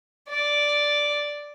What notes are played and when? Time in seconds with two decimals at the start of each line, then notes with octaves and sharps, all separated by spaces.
0.29 D5